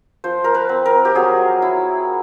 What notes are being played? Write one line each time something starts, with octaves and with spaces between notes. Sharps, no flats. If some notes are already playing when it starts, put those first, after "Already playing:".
F3 C5
A#4
B4
C4
A#4
G4
F#3 G#4
E4